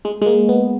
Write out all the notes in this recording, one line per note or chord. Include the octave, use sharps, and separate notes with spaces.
G#3
G#3
A#3
B3